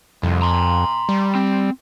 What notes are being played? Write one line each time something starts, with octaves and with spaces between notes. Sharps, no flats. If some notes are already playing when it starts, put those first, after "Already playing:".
C2 F2
A#5 C6
G3
C4